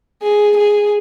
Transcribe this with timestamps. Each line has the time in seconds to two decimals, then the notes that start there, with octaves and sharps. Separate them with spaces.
0.22 G#4
0.57 G#4